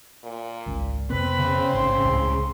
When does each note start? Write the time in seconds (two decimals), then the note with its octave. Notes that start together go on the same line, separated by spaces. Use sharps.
0.23 A#2
0.66 G#1 C#2
1.10 F2 C3 B3 C4 B4 B5
1.39 C#3
1.73 A1 G#2 C6
2.05 C#2 A2